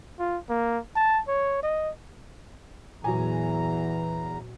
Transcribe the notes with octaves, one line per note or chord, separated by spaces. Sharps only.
F4
A#3
A5
C#5
D#5
E2 A#2 E3 F#3 G#5 A#5